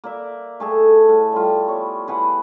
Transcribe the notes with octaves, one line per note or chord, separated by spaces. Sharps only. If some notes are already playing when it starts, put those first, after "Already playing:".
A#3 D5 E5
A3 G#4 A4
A2
G3 F4
B3 C#5
E3 B4 F#5